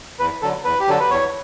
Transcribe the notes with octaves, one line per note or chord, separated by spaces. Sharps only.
E2 B4
D3 F#3 A4
E2 B4
G4
D3 F#3 A4
B4
E2 C#5